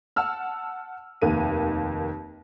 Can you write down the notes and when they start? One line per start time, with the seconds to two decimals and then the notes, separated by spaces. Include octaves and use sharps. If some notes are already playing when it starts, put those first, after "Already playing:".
0.16 F#5 A5 E6 F6
1.22 F1 D#2 A#3 D#7